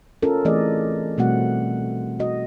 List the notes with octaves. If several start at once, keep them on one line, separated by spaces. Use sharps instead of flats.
C#4 F4 A4 A#4
E3 A3 C4 G#4 D5 D#5
B2 G3 A3 C4 F#4 F#5
F#4 D#5